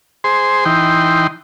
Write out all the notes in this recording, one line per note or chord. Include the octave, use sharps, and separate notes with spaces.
G#4 C5 C6
E3 D#4 G5 C6